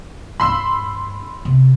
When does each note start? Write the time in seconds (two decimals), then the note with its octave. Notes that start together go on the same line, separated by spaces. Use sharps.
0.40 G2 D4 B5 C6 E6
1.45 C3